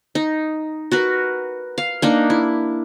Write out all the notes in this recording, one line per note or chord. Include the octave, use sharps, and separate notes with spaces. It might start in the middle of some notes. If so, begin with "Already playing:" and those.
D#4
F#4 A#4 B4
F5
A#3 D4 D#4
E4